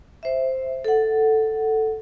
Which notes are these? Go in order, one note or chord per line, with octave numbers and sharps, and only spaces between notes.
C5 E5
A4 F#5